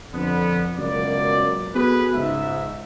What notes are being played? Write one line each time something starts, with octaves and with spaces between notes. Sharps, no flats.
F2 D3 B3
C#2 F#2 B2 A#3 D5
B3 F#4 G#4 A4 B4
C#2 G#2 E5